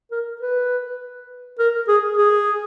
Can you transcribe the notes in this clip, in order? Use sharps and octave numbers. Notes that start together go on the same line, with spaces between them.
A#4
B4
A#4
G#4
G#4